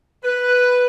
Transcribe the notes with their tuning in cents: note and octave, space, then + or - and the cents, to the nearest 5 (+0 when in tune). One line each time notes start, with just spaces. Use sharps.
B4 +0